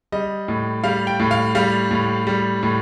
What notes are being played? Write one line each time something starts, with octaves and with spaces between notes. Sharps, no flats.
G3 D#5
A2
G3 F5
G5
A2
F5
G3 F5
A2
G3
A2